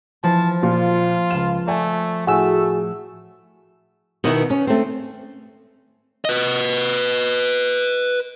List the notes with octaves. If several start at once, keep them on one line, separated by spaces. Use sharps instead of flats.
E3 F3 A5
A#2 F4
C#2 F5 E7
A3 D5 G#5
A2 A3 F#4 G#4 E6
B2 D#3 B3 E4 F#4
C#4
A3 C4
B4 D#5